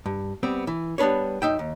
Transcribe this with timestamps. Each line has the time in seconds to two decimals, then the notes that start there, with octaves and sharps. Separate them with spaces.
0.06 G2
0.43 G3 B3 C4
0.67 E3
0.98 G3 B3 D4 B4 C#5
1.42 F#2 D#4 E5 G5
1.59 D#2